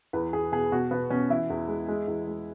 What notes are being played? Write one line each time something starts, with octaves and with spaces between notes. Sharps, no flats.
E2 B4
E2 G#4
B2 G#4
B2 F#4
B2 B3
B2 C#4
E3 E4
E2
G#3
G#3
E2
G#3